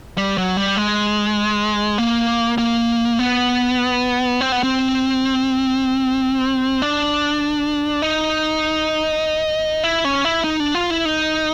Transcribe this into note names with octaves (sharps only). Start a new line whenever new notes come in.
G3
F#3
G3
G#3
A#3
A#3
B3
C4
B3
C4
D4
D#4
E4
C#4
E4
D#4
D4
F4
E4
D#4